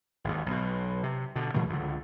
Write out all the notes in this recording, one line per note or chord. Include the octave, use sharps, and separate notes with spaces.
G#1 D#2
B1 B2
C3
B2 D3
A#2 E3 F#3 A3
C#2 D3